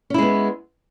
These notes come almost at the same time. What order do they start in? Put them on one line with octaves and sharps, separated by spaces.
C#4 E4 G#3 B3